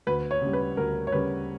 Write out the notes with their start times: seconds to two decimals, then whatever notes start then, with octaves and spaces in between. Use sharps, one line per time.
0.07 D2 B4
0.31 C#5
0.42 C#3 G3
0.53 B4
0.77 D2 A#4
1.07 C#5
1.12 C#3 G3 B4